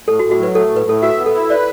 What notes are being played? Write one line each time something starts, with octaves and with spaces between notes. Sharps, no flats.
A2 A4
F#4
A2
F#4
F#3 B4
A3 A4
A2
B4
A2 A4
F#4 E5
B3
A4
E4
B4 D5